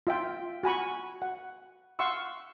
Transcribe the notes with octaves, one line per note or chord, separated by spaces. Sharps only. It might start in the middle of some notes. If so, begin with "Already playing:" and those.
F4 E5 G5
F#4 G#5 B5 C#6
F#5
F5 F#5 C6 C#6 E6